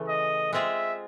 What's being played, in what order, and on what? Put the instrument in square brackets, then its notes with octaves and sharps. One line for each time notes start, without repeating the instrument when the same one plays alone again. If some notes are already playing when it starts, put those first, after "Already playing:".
Already playing: [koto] C#3 E3 A3
[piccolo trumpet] D#5
[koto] G#3 C4 F4 G#4 [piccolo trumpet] E5